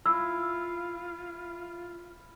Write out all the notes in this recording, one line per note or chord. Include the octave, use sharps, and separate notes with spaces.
E4 F4 E6